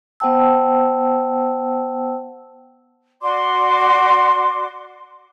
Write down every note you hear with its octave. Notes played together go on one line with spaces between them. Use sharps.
B3 C5 F#5 G5 A5 E6
F#4 D5 C6 D6